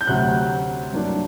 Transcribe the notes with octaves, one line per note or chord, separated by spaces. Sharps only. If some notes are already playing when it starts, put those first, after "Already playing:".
G6
D2 C3 F#3 F#6
G2 F#3 A#3 D4